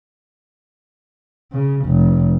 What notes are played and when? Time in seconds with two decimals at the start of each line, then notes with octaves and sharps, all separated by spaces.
1.52 C#3
1.86 F1